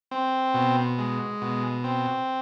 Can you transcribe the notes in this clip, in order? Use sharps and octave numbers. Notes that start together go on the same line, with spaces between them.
C4
B2
G#3
B2
C4